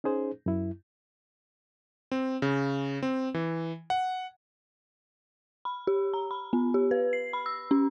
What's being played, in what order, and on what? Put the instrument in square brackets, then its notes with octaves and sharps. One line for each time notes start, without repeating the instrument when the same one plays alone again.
[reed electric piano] C#4 D#4 G#4 C5
F#2 E4
[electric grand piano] C4
C#3
C4
E3
F#5
[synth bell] B5
G4
A#5
B5
B3
G4
B4
C7
B5
E6
C#4